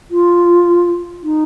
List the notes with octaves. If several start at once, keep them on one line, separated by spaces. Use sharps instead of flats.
F4
D#4